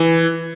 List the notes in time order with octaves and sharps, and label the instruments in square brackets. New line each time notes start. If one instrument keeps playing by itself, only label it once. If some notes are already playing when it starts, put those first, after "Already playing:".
Already playing: [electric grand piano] E3